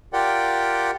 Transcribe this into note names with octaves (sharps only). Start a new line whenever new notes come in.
F4 G4 A#4 D5 F#5 G5